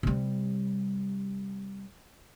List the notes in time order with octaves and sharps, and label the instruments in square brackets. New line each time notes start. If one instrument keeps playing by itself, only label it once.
[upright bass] C3 G3